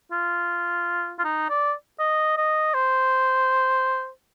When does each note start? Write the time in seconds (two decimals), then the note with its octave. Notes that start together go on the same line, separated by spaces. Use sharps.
0.12 F4
1.19 F4
1.24 D#4
1.49 D5
1.99 D#5
2.37 D#5
2.74 C5